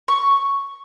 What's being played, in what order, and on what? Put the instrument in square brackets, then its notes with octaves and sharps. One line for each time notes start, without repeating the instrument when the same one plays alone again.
[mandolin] C#6